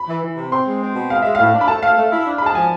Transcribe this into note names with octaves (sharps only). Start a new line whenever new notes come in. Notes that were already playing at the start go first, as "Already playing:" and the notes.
Already playing: B5
E3
E3
C3
C4 C6
G#3
C4
B2
G#3 F5
G#3 E5
A2 F5
D4
B5
A3 A5
A3 F5
A3
E4
D4
G#3 B5
A5
F3 G#5